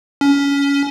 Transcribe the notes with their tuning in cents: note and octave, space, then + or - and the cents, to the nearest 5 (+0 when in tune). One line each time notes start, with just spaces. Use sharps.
C#4 +25